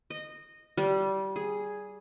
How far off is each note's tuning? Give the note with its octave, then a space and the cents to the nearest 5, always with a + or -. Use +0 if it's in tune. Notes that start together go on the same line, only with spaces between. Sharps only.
D#5 -15
G3 -20
G#4 +0